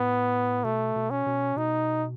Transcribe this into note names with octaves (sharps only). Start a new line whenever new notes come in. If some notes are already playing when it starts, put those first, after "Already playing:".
Already playing: A2 B3
B2 A3
B2
C#4
B2
B2 D#4